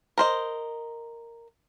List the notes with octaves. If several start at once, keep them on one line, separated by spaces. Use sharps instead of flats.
A#4 C5 D#5